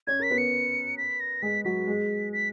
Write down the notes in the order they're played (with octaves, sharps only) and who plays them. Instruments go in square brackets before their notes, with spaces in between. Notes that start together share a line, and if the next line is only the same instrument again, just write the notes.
[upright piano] C#4 C#5 [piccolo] G#6
[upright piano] A#4 [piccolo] B6
[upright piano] B3 B4
[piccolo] C#7
B6
A#6
[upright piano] G#3 G#4 [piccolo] B6
[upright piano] F#3 F#4 [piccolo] B6
[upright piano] G#3 G#4
[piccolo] B6